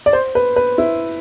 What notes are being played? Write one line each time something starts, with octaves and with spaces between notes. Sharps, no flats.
D5
C5
B4
B4
E4